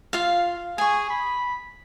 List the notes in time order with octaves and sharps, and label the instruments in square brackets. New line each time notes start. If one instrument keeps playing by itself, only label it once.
[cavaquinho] F4 F5
[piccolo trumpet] G#4 [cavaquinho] G#5 C#6
[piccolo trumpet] B5